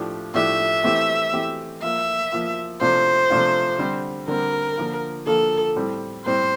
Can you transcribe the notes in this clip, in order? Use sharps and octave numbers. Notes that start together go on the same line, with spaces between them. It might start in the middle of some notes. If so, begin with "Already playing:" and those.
Already playing: A2 F3 A3 D4 G4
A2 F3 A3 D4 G4 E5
E3 A3 C4 G4
E3 A3 C4 G4
F3 A#3 F4 E5
F3 A#3 F4
C3 F3 A3 D4 F4 C5
C3 F3 A3 D4 F4
D3 G3 C4
D3 G3 C4 A#4
D3 F3 A#3 F4
D3 F3 A#3 F4 A4
A2 G3 C4
A2 G3 C4 C5